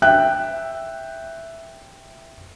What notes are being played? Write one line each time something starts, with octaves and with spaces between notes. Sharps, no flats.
E5 G5 F#6